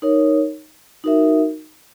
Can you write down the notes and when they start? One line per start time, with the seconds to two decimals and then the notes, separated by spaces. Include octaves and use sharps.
0.02 D#4 A#4 C#5
1.04 D#4 F#4 A#4 E5